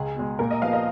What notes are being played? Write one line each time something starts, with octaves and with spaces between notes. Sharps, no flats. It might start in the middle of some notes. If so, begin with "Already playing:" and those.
Already playing: C#2 G#4
B2 G#3
A#2 A#4
D#5
F3 B3 F4 F5
D#5